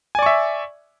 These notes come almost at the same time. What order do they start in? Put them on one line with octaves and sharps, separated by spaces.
G#5 D5 C#6 E5